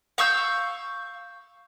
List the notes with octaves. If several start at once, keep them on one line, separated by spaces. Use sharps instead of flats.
F5 C#6 E6 G6